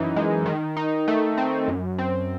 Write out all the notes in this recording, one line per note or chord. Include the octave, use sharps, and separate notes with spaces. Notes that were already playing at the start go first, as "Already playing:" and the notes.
Already playing: F#2 E3 D#4
G#3
D#3
D#4
A3
C4
F#2
C4